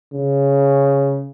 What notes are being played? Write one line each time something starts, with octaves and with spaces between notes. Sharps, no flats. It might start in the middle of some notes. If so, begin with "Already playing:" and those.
C#3